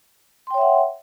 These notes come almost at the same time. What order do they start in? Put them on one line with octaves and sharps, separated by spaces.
C6 G5 C#5 E5 F#5